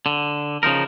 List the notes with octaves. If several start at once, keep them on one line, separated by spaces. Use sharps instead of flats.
D3
C#3 F3 D#4 A#4